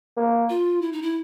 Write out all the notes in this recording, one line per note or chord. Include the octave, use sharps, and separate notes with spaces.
A#3
F4
E4
D#4
E4